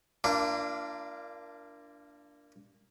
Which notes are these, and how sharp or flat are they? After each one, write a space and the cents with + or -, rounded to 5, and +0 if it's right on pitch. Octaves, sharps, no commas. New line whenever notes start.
A#3 +0 D4 +0 F4 -40